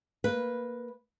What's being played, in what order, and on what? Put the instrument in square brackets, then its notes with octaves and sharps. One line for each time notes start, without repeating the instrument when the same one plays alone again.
[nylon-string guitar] A#3 B4